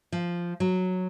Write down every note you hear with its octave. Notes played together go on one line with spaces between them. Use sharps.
F3
F#3